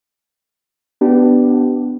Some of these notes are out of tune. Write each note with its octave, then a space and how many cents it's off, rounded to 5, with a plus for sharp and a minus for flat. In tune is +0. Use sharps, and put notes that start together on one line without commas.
B3 +5 D4 +5 G4 -25